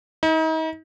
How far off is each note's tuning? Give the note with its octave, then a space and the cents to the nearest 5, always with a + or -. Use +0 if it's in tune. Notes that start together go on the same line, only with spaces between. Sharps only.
D#4 +40